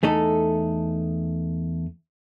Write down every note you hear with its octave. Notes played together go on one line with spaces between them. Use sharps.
E2 A3 D#4 A4